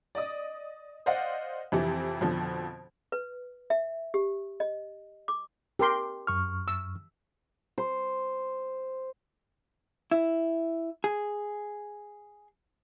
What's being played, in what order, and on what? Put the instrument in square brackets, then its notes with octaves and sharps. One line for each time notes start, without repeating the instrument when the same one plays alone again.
[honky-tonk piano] D5 D#5 D#6
C5 D5 D#5 F5 F#5
F2 C3 E3
F2 B2 D3 F3
[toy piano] B4
E5
G4
D#5
D6
[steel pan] G4 A#4 C6
[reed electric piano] F#2 C#6 F6
[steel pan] E6
[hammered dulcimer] C5
[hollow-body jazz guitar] E4
G#4